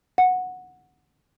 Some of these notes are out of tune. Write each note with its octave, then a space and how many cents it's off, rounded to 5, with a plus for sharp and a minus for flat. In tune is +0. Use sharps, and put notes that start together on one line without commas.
F#5 -10